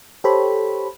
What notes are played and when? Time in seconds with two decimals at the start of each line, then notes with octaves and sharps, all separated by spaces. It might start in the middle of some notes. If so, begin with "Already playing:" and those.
0.24 G4 A4 C5 C#5 B5